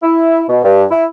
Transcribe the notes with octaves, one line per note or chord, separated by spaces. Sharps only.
E4
B2
G2
E4